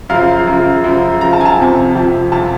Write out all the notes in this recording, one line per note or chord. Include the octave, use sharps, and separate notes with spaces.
F#2 C#3 F3 F5
F#2 C#3 F3
F#2 C#3 F3
F#2 C#3 F3 A#5
A5
G#5
A5
F2 C3 F3
F2 C3 F3
F2 C3 F3 A5